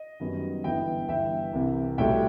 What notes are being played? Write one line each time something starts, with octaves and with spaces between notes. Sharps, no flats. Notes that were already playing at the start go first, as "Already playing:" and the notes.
Already playing: D#5
F#2 D#3 G3 B3
G1 G2 E3 B3 E5 G5
G1 G2 E3 E5 G5
C2 C3 E3
B1 A2 G3 E5 G5